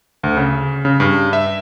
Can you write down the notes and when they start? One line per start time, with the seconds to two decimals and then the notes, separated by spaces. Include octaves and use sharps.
0.23 D2
0.37 C#3
0.85 C#3
1.00 G2
1.33 E5